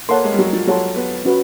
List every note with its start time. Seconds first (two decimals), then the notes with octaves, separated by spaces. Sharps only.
0.09 A#3 A4 C#5 F#5 A5 C6
0.24 G#3
0.32 G3
0.39 F#3
0.53 F3
0.67 F#3 A4 C#5 F#5 A5 C6
0.96 B3
1.25 C#4 F#4 B4